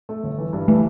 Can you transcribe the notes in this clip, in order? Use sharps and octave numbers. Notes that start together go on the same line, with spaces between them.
A3
G1
E3
G2
E3 A3